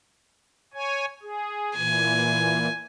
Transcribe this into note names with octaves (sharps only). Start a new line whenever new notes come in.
C#5 G#5
G#4
A#2 E3 G#5